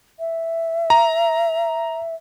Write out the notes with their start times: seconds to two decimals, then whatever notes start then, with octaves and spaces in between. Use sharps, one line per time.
0.19 E5
0.90 A#5